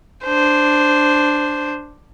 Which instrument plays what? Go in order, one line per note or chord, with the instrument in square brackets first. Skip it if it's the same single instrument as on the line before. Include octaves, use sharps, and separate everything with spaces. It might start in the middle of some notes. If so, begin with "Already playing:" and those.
[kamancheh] D4 C5